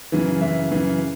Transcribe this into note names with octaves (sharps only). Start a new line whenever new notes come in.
F#2 C#3 E3
F#2 C#3 E3 E5
F#2 C#3 E3